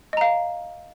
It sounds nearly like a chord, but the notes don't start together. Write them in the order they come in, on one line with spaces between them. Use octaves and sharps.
D#5 A#5 F5